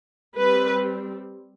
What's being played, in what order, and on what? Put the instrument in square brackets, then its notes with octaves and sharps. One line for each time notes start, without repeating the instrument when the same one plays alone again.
[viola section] G3 C4 B4